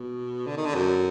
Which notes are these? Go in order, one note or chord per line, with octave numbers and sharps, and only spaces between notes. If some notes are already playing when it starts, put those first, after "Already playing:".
Already playing: B2
D3
D#3
D3
F#2